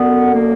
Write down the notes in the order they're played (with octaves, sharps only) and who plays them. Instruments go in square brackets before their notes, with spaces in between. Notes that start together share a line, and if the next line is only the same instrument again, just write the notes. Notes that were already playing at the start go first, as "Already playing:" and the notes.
Already playing: [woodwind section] F#2 D3 B3
A#3